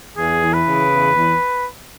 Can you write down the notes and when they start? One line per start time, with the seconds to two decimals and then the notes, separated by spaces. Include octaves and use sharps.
0.16 E2 G#4
0.42 E3
0.53 B4
0.66 C#3
0.91 E2
1.15 E2